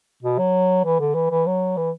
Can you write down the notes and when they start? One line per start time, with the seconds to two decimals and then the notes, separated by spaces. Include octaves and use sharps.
0.23 B2
0.38 F#3
0.85 E3
0.99 D3
1.15 E3
1.31 E3
1.46 F#3
1.77 E3